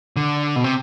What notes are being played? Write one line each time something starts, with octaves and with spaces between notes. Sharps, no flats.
D3
B2
C3